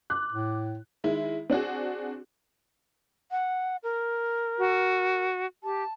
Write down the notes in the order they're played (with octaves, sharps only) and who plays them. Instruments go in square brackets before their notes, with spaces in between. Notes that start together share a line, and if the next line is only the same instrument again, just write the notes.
[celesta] D6 [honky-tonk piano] F#6
[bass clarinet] A2
[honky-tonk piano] D#3 G#3 E4
C4 D4 F#4 G#4
[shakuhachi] F#5
A#4
[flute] F#4
[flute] G4 [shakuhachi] A5